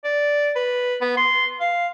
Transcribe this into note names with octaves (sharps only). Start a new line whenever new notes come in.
D5
B4
B3
C6
F5